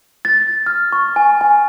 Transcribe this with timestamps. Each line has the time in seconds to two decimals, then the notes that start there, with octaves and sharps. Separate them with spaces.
0.25 A6
0.66 F6
0.92 C#6
1.16 G#5
1.41 G#5